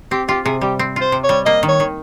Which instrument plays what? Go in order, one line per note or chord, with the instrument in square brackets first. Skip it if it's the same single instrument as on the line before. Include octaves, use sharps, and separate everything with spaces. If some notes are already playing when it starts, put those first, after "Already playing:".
[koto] C4 [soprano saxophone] G4
[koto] F4 [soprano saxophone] G4
[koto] C3 [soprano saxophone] G#4
[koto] G3 [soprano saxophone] G4
[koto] C4
[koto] F4 [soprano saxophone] C5
[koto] C3
[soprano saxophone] C#5
[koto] G3
[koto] A#3 [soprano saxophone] D#5
[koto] D#3
[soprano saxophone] C#5
[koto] D#3